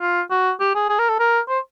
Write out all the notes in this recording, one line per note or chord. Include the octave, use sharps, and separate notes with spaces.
F4
F#4
G4
G#4
G#4
A#4
A4
A#4
C5